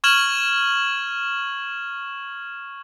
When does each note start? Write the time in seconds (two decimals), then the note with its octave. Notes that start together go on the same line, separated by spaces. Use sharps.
0.04 C#6 F6 G#6 E7 F#7